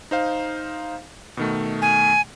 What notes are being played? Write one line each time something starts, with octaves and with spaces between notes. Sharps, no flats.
D#4 C5 F5
B2 D#3 A3
G#5